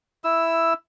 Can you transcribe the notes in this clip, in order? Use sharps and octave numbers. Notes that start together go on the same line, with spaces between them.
E4 E6